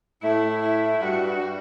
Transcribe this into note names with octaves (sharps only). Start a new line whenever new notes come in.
A2 A3 E4
E4
G2 G3 F#4
G3